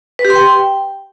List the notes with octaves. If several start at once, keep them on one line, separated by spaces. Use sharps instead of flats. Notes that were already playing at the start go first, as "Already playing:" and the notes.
B4
G4
C6
G5